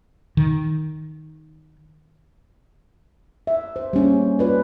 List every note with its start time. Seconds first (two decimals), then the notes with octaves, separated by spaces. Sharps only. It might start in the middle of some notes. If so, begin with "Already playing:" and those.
0.37 D#3
3.47 E5
3.76 C5
3.93 G3 A#3 C#4
4.39 F4 B4 D5